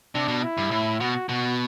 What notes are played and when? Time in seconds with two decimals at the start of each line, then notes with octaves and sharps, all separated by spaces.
0.14 C3 D4
0.28 B2
0.43 E4
0.58 G2
0.71 A2
1.00 B2 F#4
1.29 B2 F#4